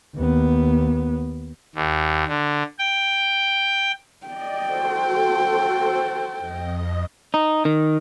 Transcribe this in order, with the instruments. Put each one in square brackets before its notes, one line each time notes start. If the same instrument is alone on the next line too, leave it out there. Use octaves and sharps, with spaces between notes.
[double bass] D#2 B3
[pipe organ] D#2
D3
G5
[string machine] D5 D#5 [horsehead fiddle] G5
[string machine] F#4 A4 C5
F2 D#5
[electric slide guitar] D#4
D#3